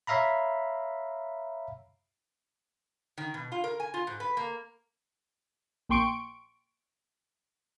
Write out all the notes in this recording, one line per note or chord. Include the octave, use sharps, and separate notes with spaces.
C#5 E5 F5 A#5 B5
D#3
B2
F4
A#4
G#5
F4
G#2
B4
A#3
A#1 A#3 G5 C6 C#6 D7